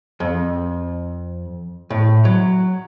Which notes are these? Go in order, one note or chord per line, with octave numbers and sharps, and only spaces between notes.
F2
A2
F#3